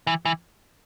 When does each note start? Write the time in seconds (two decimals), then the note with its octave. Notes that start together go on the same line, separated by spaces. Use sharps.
0.07 E3
0.25 E3